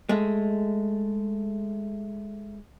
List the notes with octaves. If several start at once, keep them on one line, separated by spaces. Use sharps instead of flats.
G#3 A3